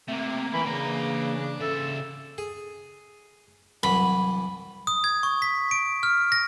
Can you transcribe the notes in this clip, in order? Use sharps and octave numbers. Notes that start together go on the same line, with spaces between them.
C3 A3 A#3
E3 A#4 G5 B5
C#3 E3 A#3 D4 A#5
C#3 A4 E5
G#4
C2 E3 F#3 B5
D#6
G#6
C#6
B6
D7
F6
A#6